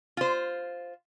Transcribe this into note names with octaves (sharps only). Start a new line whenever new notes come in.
F4 C5